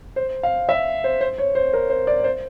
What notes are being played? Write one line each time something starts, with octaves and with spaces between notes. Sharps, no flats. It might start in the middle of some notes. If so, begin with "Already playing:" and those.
C5
F5
E5
C5
C5
C#5
C5
A#4
C5
D5
C5